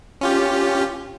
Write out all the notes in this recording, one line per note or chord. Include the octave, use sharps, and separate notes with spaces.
C#4 F4 G4